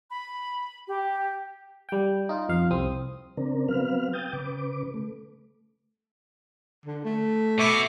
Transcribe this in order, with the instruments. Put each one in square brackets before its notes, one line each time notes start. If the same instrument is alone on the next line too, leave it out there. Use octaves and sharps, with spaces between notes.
[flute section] B5
G4
[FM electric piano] G3 G5
D#4 F4
F2 F5
C2 C4 D#6
[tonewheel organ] C#3 C4 D4 A#4
F#3 B3 C4 B4 F5 F6
G5 D#6 G6 A6
C#3 B4 D6
A3
[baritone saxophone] D3
A3
[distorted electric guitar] B2 B3 [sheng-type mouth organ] E5 C#6 D6